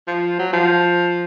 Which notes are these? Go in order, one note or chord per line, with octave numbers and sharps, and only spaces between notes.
F3
F#3
F3